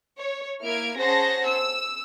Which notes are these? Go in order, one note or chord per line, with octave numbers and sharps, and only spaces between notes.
C#5
A#3 E4 F6 G#6 D7
C#4 G#4 C5 F#5 A5 A#6
E6